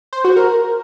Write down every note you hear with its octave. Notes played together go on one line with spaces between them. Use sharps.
C5
F#4
A#4